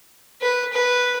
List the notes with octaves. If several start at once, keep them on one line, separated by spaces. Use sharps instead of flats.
B4
B4